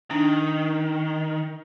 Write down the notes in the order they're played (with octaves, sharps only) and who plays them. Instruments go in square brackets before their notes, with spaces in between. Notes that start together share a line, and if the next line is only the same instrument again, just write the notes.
[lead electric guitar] D#3 [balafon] D4